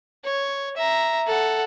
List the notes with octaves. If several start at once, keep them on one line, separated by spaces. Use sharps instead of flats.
C#5
E5 A#5
A4 F#5